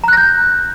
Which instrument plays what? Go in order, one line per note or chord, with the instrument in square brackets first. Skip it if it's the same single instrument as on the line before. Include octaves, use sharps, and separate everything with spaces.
[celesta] A#5
F#6
A#6
G6